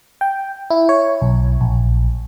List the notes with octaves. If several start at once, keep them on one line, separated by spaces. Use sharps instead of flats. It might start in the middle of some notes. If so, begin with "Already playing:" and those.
G5
E4
C#5
B1
A#1